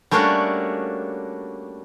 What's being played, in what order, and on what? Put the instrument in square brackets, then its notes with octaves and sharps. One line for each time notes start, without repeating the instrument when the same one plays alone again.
[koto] G3 A3 A#3 C#4 D4 F#4